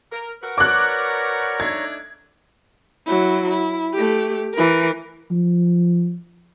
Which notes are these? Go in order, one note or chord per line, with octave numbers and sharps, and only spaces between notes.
A#4
F#4 A#4 B4
C#5 D5 A#5 D6 F#6
A3 D4 D#4 G#6
F#3 E4
E4
A3 G4
E3 A#4
F3